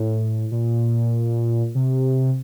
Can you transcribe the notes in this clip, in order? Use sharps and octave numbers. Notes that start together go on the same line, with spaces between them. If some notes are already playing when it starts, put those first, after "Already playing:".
Already playing: A2
A#2
C3